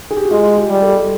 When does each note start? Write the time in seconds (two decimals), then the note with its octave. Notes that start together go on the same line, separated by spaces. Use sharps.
0.11 G#4
0.17 G4
0.25 F#4
0.31 G#3 F4
0.57 G4
0.69 G3
0.82 A4